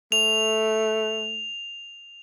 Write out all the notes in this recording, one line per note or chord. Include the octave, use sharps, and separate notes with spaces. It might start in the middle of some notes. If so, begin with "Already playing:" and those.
A3 F7